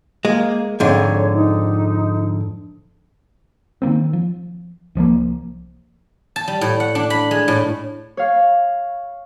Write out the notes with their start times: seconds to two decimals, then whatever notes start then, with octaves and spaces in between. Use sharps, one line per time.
0.25 G#3 A#3
0.80 F2 G#2 D3 C#5
1.34 D#4
3.82 D#3 F3 A#3 C4
4.13 F3
4.95 C2 F3 G3 A#3
6.36 A5
6.48 G3
6.61 A2
6.80 F#5
6.95 D4
7.10 B5
7.31 G#3
7.48 A2
8.17 C#5 F5